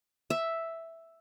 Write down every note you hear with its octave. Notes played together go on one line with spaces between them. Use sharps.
E5